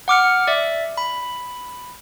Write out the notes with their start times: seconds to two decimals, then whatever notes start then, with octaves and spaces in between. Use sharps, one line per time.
0.08 F#5 D6 F6 C#7
0.47 D5 E5
0.97 B5